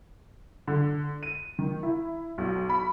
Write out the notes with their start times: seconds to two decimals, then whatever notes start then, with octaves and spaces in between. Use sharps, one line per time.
0.68 D3
1.23 D#7
1.59 D#3
1.83 E4
2.38 B1
2.70 B5